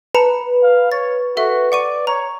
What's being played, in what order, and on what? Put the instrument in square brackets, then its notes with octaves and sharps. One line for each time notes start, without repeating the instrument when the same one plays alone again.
[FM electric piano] B4 [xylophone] A5 A#5 C#7
[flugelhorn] F5
[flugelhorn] C#5 [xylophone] A6
[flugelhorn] F#4 [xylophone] A4 E5
[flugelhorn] D5 [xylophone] F#5 C#6 D#7
[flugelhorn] C#5 [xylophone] A#5